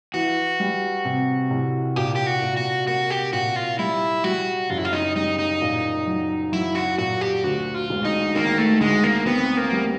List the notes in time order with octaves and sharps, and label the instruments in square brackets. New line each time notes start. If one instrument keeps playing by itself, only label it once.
[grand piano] E3 [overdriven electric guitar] F#4
[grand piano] G3
C3
C2
[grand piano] A#2 [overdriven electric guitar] G4
[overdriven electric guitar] G4
F#4
[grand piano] A#2
[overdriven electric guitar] F#4
[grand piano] A#3 [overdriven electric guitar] F#4
[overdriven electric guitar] G4
[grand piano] A#2 [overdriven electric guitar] F#4
[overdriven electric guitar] F4
[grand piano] G3 [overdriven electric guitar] E4
[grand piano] G3 [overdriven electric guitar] F#4
[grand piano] F#1 [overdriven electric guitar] F4
[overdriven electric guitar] E4
F4
D#4
[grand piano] G3 [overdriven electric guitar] D#4
[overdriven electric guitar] D#4
[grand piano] A#2
F#3
[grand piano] F#3 [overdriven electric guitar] E4
[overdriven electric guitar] F#4
[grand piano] A#2 [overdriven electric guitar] F#4
[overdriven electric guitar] G4
[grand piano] D2 [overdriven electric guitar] F#4
[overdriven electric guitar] F4
[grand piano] E1
[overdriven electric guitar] D#4
[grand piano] D#3 [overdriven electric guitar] A#3
[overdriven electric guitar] A3
[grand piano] D2 [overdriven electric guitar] G#3
[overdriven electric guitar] A#3
[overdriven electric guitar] B3 [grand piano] C4
[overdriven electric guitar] A#3
[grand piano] G3